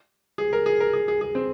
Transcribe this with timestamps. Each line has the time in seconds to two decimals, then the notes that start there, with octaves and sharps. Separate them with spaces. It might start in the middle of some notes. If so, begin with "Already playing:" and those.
0.38 G#4
0.53 A#4
0.66 G#4
0.80 A#4
0.93 G#4
1.08 G#4
1.21 G#4
1.35 C4